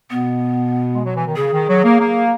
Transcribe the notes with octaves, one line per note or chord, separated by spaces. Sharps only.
B2 B3
G#3
F#3
E3
D#3
C#3 G#4
D#3
F#3
A#3
A#3